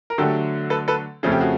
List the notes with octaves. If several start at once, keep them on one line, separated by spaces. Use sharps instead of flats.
A#4
D3 F#3 A3 G4 A4
A4 B4
A4 B4
F2 C#3 F3 A3 C#4 G#4
G4
F#4 G#4